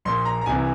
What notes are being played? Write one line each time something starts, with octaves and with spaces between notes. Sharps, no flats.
A#1 A#2 C6
A#5
A#5
C2 C3 E3 G#5